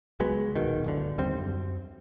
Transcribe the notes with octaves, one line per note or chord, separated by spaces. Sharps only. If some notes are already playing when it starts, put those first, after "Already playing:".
C#2 F#3 G#3 B3
D#1 B2 D#3
D1 G1 D3
D#2 G3 C4
F#2